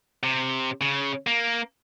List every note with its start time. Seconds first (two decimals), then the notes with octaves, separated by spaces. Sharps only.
0.23 C3
0.81 C#3
1.27 A#3